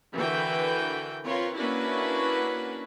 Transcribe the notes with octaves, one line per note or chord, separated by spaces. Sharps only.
D3 E3 F#4 A#4 B4 G5
C4 F4 A#4 B4 C#5
A#3 C#4 D4 E4 F#4 B4